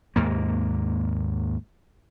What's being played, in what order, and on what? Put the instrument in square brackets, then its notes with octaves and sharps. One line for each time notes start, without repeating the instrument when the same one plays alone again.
[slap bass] D#2 G#2 A#3